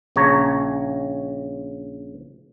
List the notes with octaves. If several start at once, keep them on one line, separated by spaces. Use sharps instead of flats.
A#1 C#3 C#5 A#5